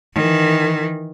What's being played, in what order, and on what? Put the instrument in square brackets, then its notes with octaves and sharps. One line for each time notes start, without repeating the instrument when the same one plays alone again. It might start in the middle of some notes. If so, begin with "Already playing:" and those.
[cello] D#3 E3